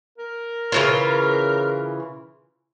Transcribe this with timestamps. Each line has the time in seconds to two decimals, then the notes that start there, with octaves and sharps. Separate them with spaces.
0.18 A#4
0.72 C#3 E3 F4